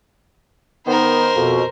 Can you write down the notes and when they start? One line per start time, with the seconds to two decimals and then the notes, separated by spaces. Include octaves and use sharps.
0.86 D#3 B3 D#4 A#4 C5
1.36 F2 B2